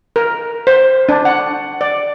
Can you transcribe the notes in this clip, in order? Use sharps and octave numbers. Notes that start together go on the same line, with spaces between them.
A#4
C5
D4
F#5
D5